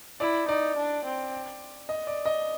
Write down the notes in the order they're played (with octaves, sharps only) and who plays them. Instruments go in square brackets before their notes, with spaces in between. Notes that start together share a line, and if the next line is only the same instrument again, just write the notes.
[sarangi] E4 [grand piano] D5
[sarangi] D#4 [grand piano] D5
[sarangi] D4
C4
[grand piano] D#5
D5
D#5